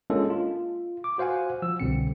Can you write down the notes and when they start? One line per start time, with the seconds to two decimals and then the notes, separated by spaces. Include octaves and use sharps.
0.10 G#3 A#3 C#4 D4 F4 A4
0.30 F4
1.04 D6
1.18 F#4 C5 F5 F#5 G#5
1.62 F3 E6
1.80 C2 B2 D3 C4 C#7